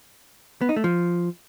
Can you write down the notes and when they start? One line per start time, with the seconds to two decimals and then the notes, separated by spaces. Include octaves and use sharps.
0.61 B3
0.69 D#4
0.76 A3
0.84 F3